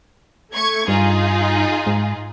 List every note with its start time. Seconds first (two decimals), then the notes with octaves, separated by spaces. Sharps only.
0.54 A3 C#6 G#6
0.88 G2 D#4 F4 G#4
1.87 G#2